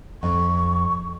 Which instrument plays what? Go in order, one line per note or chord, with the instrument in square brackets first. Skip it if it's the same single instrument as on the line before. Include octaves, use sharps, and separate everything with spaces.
[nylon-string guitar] F2 [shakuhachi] C#6